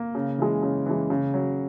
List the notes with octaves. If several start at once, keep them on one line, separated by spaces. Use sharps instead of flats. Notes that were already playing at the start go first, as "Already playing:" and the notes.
Already playing: A#3
C#3
E3 G#3
C#3
E3 G#3
C#3
F#3